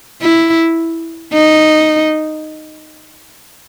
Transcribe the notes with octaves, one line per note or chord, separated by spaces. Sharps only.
E4
D#4